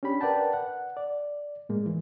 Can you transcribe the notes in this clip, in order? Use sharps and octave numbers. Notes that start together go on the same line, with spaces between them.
C#4 D4 G4 B5
A#4 B4 D5 F#5 G5 A5
F#5
D5
A2 G#3 A#3
E3